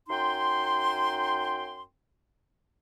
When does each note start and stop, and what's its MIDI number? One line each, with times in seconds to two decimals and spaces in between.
0.09 1.82 42
0.09 1.82 63
0.09 1.82 79
0.09 1.82 84